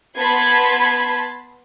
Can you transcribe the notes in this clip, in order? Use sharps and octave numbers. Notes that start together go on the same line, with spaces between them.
B3 A5 B5 C6 G#6